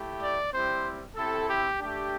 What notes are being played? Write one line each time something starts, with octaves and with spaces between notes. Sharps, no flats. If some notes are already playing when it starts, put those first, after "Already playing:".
Already playing: A3 E4 G4
D5
G3 C4 E4 G4 C5
C4 E4 G4 A4
G4
A3 D4 G4